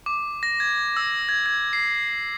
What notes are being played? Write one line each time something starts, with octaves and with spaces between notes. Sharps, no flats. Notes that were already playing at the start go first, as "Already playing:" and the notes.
D6
A#6
G#6
E6
G#6
G#6
C7